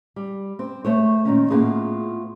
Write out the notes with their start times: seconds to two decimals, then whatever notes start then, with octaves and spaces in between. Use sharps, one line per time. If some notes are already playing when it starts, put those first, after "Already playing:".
0.16 G3
0.59 C4
0.85 A3 C5 C#5
1.25 A#2 D#3 C#4
1.50 A2 A#3 B3 D#4 F4 G#4